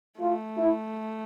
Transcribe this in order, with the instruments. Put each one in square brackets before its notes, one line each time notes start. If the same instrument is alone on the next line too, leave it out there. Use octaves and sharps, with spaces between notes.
[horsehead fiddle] A3 [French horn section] F4
[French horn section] E4